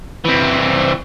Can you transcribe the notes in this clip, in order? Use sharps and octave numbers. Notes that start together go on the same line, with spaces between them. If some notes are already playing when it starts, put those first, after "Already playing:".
E3 C4